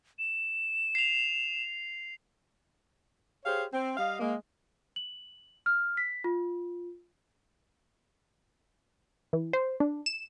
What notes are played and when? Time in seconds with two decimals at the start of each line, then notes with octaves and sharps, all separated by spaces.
0.19 E7
0.95 C7 F7
3.45 G4 G#4 C5 C#5 F5
3.72 C4
3.97 G3 D#5 F5
4.20 G#3 A#3
4.96 F#7
5.66 F6
5.97 B6
6.24 F4
9.33 E3
9.53 C5
9.80 D4
10.06 E7